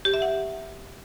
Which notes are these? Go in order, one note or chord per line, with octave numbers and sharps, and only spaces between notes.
G4
E5
F#5